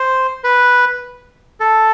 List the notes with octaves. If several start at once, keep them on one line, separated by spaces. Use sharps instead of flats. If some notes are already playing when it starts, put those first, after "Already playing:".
Already playing: C5
B4
A4